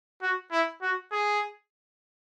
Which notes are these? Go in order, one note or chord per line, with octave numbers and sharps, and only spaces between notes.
F#4
E4
F#4
G#4